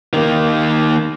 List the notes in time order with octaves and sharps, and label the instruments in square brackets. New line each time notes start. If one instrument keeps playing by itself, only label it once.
[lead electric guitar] D#3 A#3